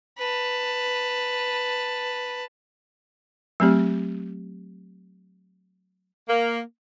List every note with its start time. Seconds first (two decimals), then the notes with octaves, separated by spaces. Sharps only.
0.18 B4 A5
3.60 F#3 A3 C4 G4
6.29 A#3